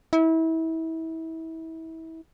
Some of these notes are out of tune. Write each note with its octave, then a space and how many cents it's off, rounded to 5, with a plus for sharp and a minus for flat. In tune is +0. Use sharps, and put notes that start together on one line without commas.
E4 -30